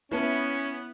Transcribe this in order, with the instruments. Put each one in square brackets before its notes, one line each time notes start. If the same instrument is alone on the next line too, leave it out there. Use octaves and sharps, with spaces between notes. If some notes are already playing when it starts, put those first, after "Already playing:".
[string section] B3 [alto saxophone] C#4 [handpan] E4 [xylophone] B4 A5